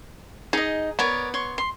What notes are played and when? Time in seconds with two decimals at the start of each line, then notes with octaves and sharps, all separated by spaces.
0.53 D#4 G#4 D#5
0.99 B3 A#4 C#5 D5
1.34 C#5 C6 C#6
1.58 C6